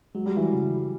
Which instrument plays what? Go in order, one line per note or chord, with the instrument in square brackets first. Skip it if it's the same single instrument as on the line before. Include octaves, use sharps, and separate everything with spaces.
[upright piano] F#3 [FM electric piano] G#3
[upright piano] G3
E3 F#3
[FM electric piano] C#3